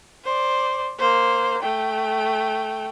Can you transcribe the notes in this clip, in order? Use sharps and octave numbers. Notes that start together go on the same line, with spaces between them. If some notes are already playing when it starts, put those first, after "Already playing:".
C5 D5
A#3 C5
A3 G5